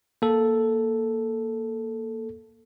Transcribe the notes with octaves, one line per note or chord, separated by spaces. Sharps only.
A#3 A4